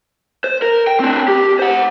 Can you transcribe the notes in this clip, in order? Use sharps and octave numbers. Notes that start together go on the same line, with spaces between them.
C5
A#4
G5
C4 D4
G4
C5 F#5